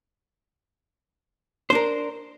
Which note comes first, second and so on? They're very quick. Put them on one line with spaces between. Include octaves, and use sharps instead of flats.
C5 D4 A#4